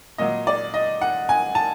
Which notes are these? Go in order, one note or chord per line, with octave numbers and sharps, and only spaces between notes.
A#2 F#3 D#5
D5
D#5
F#5
G#5
A5